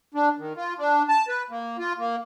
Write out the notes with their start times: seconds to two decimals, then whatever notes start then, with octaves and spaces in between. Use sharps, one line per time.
0.14 D4
0.39 D#3
0.57 F4
0.78 D4
1.09 A5
1.28 B4
1.50 A#3
1.79 F4
1.98 A#3